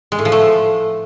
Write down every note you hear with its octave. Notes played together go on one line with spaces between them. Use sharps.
G#3
A2
F3
A3